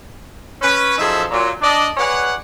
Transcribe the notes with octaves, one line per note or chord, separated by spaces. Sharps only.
C#4 B4
F#2 F3 D#4 G#4 A4 E5
A#2 F#3
D4 D5 D#5
G#4 B4 C#5 D5 F#5